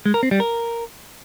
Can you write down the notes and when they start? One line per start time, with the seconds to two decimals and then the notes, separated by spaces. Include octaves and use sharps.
0.06 G#3
0.14 A#4
0.23 C4
0.31 G3
0.40 A#4